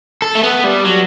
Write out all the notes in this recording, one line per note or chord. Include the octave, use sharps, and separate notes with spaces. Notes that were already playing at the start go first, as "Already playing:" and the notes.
A4
A3
B3
G3
F#3